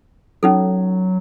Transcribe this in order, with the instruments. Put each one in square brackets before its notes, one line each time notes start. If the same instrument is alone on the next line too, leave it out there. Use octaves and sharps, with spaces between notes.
[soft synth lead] F#3 [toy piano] C#4 D#4 A4